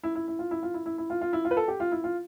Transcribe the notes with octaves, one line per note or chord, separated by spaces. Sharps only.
E4
E4
E4
F4
E4
F4
E4
E4
E4
F4
F4
E4
F4
B4
A4
G4
F4
E4
F4